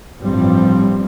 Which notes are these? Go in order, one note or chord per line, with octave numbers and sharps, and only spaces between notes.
A1 G2 F3 G3 C4